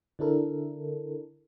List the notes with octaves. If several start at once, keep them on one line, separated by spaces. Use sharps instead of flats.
D3 D4 E4 A4 A#4